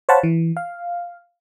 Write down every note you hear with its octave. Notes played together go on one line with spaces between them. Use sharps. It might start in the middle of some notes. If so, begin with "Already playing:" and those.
C5 C#5 F5 F#5 A5 B5
E3
F5